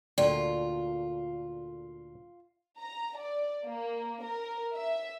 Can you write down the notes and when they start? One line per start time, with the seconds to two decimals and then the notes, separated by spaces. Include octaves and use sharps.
0.18 D2 A#2 D3 F4 D5 G5
2.80 A#5
3.19 D5
3.65 A#3
4.23 A#4
4.75 E5